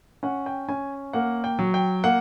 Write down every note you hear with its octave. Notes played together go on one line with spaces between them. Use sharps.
C#4 F#5
G5
C#4 G#5
A#3 F#5
G5
F#3
G5
A#3 F#5